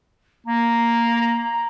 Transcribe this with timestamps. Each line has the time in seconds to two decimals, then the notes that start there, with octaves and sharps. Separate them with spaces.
0.46 A#3 A#5